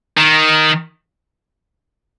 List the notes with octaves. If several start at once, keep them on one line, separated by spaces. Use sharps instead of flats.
D#3